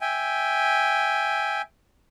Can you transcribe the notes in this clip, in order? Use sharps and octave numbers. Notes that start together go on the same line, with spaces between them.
E5 G5 G#5